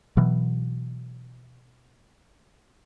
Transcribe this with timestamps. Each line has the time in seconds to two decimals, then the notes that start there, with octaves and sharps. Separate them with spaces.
0.17 B2 E3 F#3